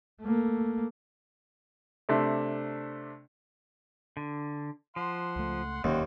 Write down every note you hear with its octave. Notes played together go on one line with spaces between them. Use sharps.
A3 A#3
C3 A3 D4
D3
F3 F#5 C6
C#2 A3
E1 D#2 G3 A#3 C#4 F#4 C5